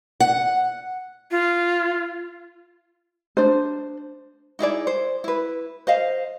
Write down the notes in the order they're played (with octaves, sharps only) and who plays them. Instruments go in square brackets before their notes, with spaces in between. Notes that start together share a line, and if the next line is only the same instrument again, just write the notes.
[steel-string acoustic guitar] F#5
[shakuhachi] F4
[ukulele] D4 C5
D#4 E4 G#4 D5
C5
E4 B4
C5 D#5 F5